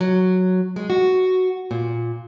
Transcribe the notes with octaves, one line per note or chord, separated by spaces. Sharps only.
F#3
G#3
F#4
A#2